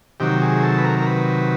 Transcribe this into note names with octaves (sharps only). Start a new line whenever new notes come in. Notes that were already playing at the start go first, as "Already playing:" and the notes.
C3 D#3 F#3 G4
G#4
A4
B4
A#4
A#4
B4